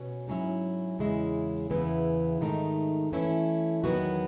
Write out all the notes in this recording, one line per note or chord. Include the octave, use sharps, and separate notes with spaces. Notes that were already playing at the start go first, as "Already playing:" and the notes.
Already playing: B2 C#4
G#2 F#3 C#4 E4
E2 C#3 G#3 C#4 E4
E2 C#3 E3 B3 E4
G#2 D#3 A3 D#4
E3 A3 C#4 E4
E2 D#3 F#3 B3 F#4